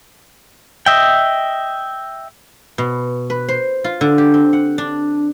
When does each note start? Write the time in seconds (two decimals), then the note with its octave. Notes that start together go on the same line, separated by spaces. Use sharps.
0.86 D#5 E5 G5
2.78 B2
3.30 B4
3.49 C5
3.84 F4
4.01 D3
4.18 G4
4.34 C4
4.53 F#5
4.78 D4